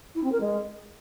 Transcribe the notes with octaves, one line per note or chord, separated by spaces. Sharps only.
E4
C4
A#4
G#3